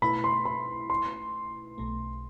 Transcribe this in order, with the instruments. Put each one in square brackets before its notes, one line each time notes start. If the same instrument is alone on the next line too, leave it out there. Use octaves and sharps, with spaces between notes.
[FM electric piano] B2 A3 E4 B4 [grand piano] B5
[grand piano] C6
B5
C6
[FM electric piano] B1 B2 A3